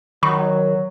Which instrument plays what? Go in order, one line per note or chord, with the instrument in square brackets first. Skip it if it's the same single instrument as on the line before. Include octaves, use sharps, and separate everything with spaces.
[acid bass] D#3 [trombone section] F#3 [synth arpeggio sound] B5 C#6